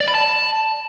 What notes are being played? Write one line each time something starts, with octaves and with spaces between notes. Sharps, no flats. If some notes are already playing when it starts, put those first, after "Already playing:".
D5
B5
A5